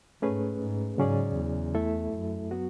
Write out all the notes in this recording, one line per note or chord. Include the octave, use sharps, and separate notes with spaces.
G#2 A3 C#4 G#4 B4
G#2
G#2 C#3 F#3 C#4 G#4 D5
E2
A3 E4 A4 E5
F#2
F#3 B3 F#4